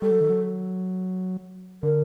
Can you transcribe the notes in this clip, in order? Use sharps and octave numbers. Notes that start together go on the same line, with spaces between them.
G3 A4
F#3
D#3
F#3
D3 A#4